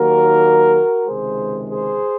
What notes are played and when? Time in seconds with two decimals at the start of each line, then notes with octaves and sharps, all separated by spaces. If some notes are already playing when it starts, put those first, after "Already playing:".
Already playing: D#2 D#3 F#3 A#3 F#4 A#4
1.06 C#2 C3 D#3 G#3 G#4 C5
1.69 G#4 C5